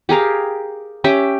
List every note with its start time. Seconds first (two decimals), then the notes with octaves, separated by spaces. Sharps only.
0.09 G4 G#4 A#4 F5
1.04 C#4 G4 E5 G5